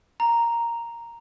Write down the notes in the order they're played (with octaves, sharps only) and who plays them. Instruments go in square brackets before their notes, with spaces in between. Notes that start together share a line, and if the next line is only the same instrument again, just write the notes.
[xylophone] A#5